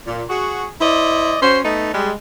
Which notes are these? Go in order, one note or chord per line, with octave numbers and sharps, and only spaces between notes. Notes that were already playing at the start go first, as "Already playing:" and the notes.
A#2
F#4 G#4
E4 C5 D5 D#5
C#4 F#4 C5
A3 B3 D#4
G3 G#3